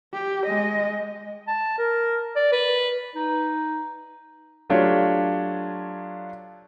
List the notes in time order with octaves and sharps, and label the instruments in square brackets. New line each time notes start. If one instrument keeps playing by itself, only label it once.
[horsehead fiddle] G4
G#3 D#5
[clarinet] A5
A#4
D5
B4
D#4
[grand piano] F#3 A3 D4 F4 G4 C#5